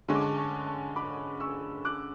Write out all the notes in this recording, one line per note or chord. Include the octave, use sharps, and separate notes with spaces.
D3 G#3 C#4 C#6
D6
A5 C#6
A5 C#6
A5 C#6
B5 D6
C#6 E6
D6 F#6